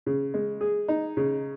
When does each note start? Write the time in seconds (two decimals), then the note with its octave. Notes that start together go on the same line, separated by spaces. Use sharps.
0.06 C#3
0.34 G#3
0.61 G#4
0.88 D#4
1.17 C#3